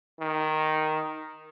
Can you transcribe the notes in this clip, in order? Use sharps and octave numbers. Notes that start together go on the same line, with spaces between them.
D#3